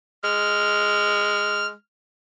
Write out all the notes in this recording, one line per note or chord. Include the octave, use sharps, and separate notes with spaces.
G#3 F6